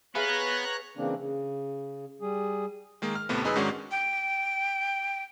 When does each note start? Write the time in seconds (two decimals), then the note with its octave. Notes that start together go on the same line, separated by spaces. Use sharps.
0.15 B3 G#4 B4 C#5 F5 A#5 F#6
0.97 C#3 E3 A#3 C4 D4
1.17 C#3
2.21 G3 G#4
3.02 D#3 G#3 A#3
3.15 F6
3.29 D#2 A2 C3 A3 B3
3.44 F#2 D#4 G#4 B4 E6
3.55 G#2 D#3 G#3 C#4 D4 F#4
3.91 G5